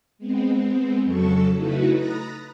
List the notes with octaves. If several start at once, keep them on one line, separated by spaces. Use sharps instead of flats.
G#3 B3 C4
F2 C#3 F#3 A4 A5 C#6
C#3 A3 D#4 E4 F#4 B4
A#5 B5 D#6 F#6 A6 A#6